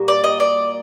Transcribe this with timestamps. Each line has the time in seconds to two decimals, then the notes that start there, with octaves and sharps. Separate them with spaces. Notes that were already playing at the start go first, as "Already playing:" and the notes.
Already playing: A#2 G3 A#3 F#4
0.08 D5
0.24 D#5
0.40 D5